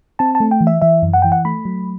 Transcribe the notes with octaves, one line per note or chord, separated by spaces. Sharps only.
C4 A5
A5
A3
G5
E3
E5
E3 E5
F#2
F#5
E3 G5
F#5
A3 B5
F#3